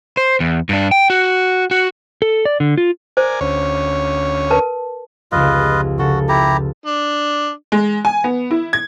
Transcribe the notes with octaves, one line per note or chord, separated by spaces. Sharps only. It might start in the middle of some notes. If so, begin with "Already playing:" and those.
C5
E2
G2 D4
G5
F#4
F#4
A4
D5
D3
F4
A#4 C5 D5 G#5
D2 C#4 C#5
A#4 B4 A5
F1 C#2 F4 B4 D#5
C#3 F#4 A4
E4 G4 A#5
D4
G#3
G#5
B3
E4
G#6